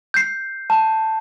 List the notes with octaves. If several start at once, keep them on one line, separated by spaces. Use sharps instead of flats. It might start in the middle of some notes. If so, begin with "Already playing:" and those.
G6 C7
A5